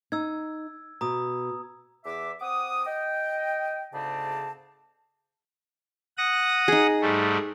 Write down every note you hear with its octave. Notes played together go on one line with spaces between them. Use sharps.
D#4 E6 G#6
B2 A#5 D#6
E2 E5 D6
C4 F#5 D6 D#6
D#5 G5
D2 G#2 C#3 C4 D5 A5
F#5 D#6 A#6
D#4 G#4
G#2 G3 A3